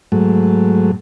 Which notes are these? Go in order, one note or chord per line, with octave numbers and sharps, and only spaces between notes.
G#2 F#3 A3